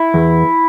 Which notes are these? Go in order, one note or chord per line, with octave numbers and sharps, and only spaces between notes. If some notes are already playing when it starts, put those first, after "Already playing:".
Already playing: E4
E2